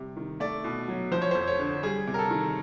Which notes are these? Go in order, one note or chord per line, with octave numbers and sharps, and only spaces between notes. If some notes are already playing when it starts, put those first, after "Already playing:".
Already playing: C3 G3
D#3
A3 D5
B2
F#3
F3 C5
C#5
F2 C5
C#5
D3
G3 G#4
C3
A#4
A4
D#3